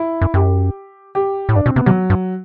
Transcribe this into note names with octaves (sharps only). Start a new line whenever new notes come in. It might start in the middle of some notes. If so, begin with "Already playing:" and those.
Already playing: E4
F#2
F#2 G4
G4
A2
G2 D4
B2 C4
C3 B3
C3 F#3
G2